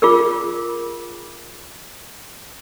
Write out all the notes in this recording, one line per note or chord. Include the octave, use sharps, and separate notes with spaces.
F4 G#4 A#4